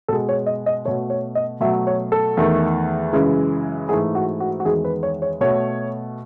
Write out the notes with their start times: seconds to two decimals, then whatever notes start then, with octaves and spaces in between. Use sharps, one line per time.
0.08 B2 G#3 A4
0.29 C#5
0.46 D#5
0.66 D#5
0.85 B2 A3 C#5
1.10 C#5
1.35 D#5
1.61 B2 F#3 A3 E5
1.87 C#5
2.12 A4
2.37 E2 D#3 A3
3.13 F#2 C#3 E3 G#3
3.89 G#2 E3 A3 G#4
4.15 F#4
4.40 F#4
4.60 F#4
4.65 E2 D#3 G#3 G#4
4.84 B4
5.03 C#5
5.22 C#5
5.41 B2 A3 C#5